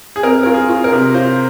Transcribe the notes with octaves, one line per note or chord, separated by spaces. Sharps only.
G#4
C4 A#4
F4 A#4
G#4
F4
A#4
C3
F4 C5